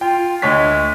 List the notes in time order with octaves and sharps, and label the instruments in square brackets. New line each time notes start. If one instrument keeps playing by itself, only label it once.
[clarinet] F4 [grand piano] G5
[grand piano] D2 C#5 B6 [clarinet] G#3